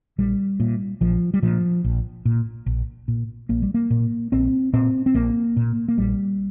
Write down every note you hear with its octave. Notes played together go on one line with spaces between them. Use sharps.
A#1 G3
A#2
A#1 F3
G3
A#2 F3
A#1
A#2
A#1
A#2
A#1 A#3
G3
A#3
A#2
A#1 C4
A#2 C4
C4
A#1 A#3
A#2
A#3
A#1 G3